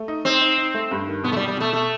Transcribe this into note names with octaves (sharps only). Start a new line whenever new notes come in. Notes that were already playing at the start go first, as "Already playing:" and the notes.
Already playing: A3
D#4
C4 D#4
D#4
D#4
A3
G2
D#3
B2 B3
A3
G3
B2
G3
B2 A3
B2 A3